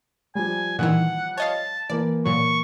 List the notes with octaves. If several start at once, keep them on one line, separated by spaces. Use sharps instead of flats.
F3 G3 G#5
A#2 D#3 E3 F#5
C#5 D#5 F5 A5
E3 A#3 D5
A#2 F#3 C#6